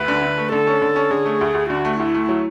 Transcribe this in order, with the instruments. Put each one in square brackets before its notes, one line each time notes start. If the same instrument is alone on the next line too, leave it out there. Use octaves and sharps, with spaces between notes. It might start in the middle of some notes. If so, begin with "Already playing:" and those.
Already playing: [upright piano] D2 [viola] B4
[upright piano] D3
D3
A3
[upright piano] D3 [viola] A4
[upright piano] C#4
D3
C#4
[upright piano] D3 [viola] G#4
[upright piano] A3
D2
D2
[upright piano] D3 [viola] F#4
[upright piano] A3
[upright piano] D2 [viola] E4
[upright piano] A3
F#3